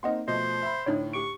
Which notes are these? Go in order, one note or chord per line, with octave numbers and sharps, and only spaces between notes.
A#3 C4 D#4 D#5 F#5 C6
B2 F3 A3 C5 D#5
E5 B5
D2 A2 D4 D#4 C#5
G4 C#6 D7